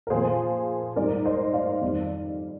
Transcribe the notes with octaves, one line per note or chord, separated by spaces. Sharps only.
A#4
A#2 F3 G#4 C5
G#2 G3 A#4 D5
C5 D#5
D5 F5
F2 D#3 G3